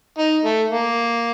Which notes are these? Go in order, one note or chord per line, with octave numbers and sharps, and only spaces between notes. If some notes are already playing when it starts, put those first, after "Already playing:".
D#4
A3
A#3